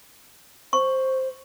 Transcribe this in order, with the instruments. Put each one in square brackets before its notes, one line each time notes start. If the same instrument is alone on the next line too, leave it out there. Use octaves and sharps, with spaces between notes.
[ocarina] C5 [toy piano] C#6